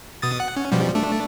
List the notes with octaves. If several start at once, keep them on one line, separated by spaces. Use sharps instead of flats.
B2 D#6 A6
F#5
C#4
B2 F3 G3
A3 D4